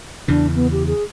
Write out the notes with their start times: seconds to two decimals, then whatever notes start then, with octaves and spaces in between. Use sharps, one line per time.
0.28 E2 C#3 E3 D4
0.55 B3
0.72 G4
0.87 G#4